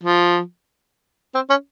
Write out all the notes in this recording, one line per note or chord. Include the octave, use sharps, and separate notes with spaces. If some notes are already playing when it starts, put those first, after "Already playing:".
F3
C4
C#4